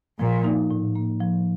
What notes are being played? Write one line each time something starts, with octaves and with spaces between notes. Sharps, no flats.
A#2 F3
D#4
A2
A#3
F3